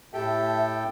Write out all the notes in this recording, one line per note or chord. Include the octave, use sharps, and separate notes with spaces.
A2 G4 A4 E5 G5 A5